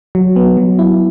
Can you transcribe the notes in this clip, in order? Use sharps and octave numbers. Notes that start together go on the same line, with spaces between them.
F#3
B3
F#3
E4